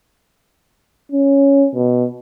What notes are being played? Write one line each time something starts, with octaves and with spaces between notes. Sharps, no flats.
C#4
B2